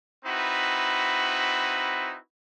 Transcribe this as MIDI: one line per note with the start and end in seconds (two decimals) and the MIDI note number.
0.25 2.16 60
0.25 2.16 63
0.25 2.16 64
0.25 2.16 66
0.25 2.16 71